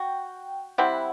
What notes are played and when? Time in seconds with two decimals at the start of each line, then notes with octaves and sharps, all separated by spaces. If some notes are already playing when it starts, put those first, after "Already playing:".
Already playing: F#4 G5
0.78 G3 C4 E4 F#5